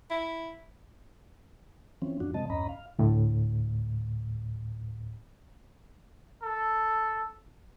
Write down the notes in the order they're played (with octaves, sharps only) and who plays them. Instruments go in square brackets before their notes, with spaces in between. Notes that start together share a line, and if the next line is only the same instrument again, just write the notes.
[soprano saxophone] E4
[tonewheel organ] E3 F3 C4 C#4
F#2 F3 D4 F#4
C3 F3 G#3 C4 D#5 A5
E2 G2 C#4 D#5 A#5 B5
F5
[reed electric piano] D2 A2
[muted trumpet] A4